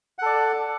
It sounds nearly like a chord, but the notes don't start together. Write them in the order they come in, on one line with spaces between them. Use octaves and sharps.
F#5 A4 D5